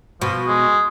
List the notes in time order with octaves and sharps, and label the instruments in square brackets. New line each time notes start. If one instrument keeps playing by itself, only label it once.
[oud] B2 [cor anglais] F3
[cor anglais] G#3